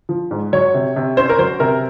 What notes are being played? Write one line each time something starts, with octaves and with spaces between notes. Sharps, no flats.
F3
G#2
F#3 C#5
C3
C3
C#4 C5
A#4
F#3 C5
C3 A#4